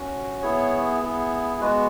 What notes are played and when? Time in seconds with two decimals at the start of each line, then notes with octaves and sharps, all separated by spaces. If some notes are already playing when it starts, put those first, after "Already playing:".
Already playing: C#4 F#4
0.42 B3 E4 G#4 C#5
1.02 B3 E4 G#4
1.61 G#3 B3 F#4 B4